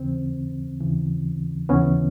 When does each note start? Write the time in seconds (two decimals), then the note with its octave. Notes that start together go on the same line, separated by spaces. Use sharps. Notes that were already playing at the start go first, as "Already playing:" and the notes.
Already playing: D#2 C#3 E3 C4
0.79 D#2 C#3 E3
1.69 D#2 C#3 E3 B3 C#4